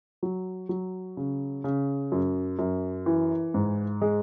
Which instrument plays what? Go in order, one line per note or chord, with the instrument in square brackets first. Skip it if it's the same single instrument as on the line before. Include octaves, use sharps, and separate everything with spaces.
[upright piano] F#3
F#3
C#3
C#3
F#2
F#2
E3
G#2
G#3